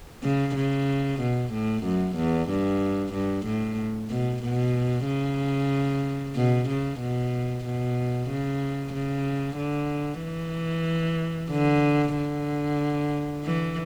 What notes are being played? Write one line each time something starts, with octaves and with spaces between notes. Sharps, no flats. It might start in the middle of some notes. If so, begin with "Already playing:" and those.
C#3
C#3
B2
A2
F#2
E2
G2
G2
A2
B2
B2
C#3
B2
C#3
B2
B2
C#3
C#3
D3
E3
D3
D3
E3